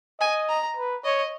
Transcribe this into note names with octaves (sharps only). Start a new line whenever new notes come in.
D#5 G#5
A#5
B4
C#5 D#5